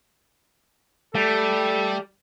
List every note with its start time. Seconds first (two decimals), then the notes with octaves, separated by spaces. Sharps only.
1.15 G3 A3 A4